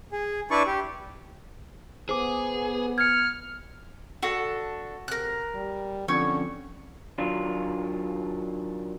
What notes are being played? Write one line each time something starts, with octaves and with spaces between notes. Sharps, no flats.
G#4
D4 E4 B4 D5 C#6
G4
B3 G#4 C5 D6
F6 G#6 C#7
D4 F#4 A4
C3 A#4 F#6
G3
D3 F3 C4 C#4 C#5 C#6
D#3 F#3 D4 F4